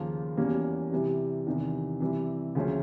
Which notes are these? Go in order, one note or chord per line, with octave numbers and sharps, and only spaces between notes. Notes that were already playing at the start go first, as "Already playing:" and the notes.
Already playing: D#2 C#3 F3 A#3
E2 B2 G3 A#3 C#4
C3 E3 G3
E2 C3 D#3
C3 E3 G3
D2 C#3 F3 A#3 C#4